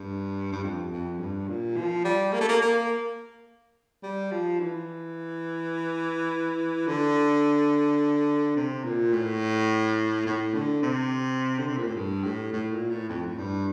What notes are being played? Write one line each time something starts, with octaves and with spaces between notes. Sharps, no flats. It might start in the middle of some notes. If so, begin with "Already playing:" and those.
Already playing: G2
G2
F2
F2
G2
A#2
F3
G3
A#3
A3
A#3
A#3
G3
F3
E3
D3
C3
A#2
A2
A2
D3
C3
D3
C3
A#2
A2
G2
A2
A2
A#2
A2
F2
A2
G2